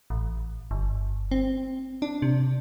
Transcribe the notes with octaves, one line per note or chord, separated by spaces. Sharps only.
A1
G1
C4
D4
C3